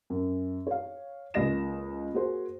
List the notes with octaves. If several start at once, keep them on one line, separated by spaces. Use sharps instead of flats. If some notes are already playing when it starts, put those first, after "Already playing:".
F#2
C#5 F5
C#2 A#3 D#5 A#6 E7
A#3 F#4 G#4 C5